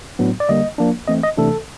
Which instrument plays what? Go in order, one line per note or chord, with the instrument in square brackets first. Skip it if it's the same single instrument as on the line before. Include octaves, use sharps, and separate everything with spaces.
[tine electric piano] A2 F#3 B3 D4
D5
D3 G3 A#3 D#5
F3 A#3 D4
E3 A3 C4 D#5
D#5
C3 E3 A3 D4 A4